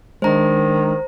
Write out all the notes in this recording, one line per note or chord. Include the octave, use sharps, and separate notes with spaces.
D#3 G#3 D4 C5 A#5